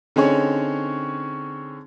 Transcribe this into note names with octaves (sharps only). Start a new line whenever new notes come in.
D3 C4 C#4 D#4 G#4 C#5